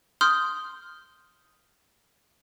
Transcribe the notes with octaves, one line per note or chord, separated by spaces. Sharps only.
C6 D#6 F6 G6